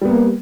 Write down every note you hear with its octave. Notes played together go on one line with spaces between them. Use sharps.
G3 A#3 B3